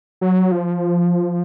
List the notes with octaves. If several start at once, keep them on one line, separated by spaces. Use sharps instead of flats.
F#3
F3